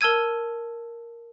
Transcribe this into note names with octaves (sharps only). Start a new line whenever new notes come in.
A#4 A5 E6 G#6 D#7